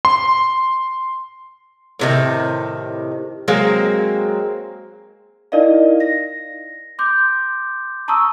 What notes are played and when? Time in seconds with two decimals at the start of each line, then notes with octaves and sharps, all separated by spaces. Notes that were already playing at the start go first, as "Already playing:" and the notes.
0.05 C6
1.99 A2 C3 D#3
3.48 F#3 G#3 A#3 C4
5.52 D#4 E4 A#4 D5 D#5 F5
6.00 A#6
6.99 C6 D6 G6
8.08 A5 A#5 C#6 D#6 E6